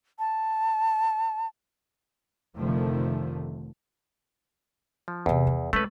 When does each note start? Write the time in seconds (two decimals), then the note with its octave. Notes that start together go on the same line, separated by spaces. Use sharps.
0.19 A5
2.57 F1 D3 D#3 F3 A3
5.08 F3
5.26 E2 C3 B3
5.47 D#3
5.73 G#3 A3 C#4 B4